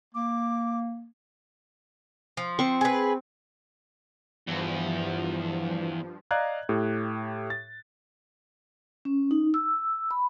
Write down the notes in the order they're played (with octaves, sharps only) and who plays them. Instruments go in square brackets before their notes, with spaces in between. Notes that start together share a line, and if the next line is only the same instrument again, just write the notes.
[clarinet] A#3 [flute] D6
[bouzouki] F3
[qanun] C4 C#6
[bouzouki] G#4 B4
[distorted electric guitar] E2 [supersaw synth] G2 F3
[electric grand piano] D5 D#5 F5 A#5 F#6 G#6
A2 G4
A6
[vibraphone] C#4
D#4
E6
B5